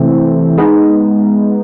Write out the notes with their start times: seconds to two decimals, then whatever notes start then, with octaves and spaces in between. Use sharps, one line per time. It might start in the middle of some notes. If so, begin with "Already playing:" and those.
Already playing: C3 E3 A3 C4
0.58 G#3 B3 D#4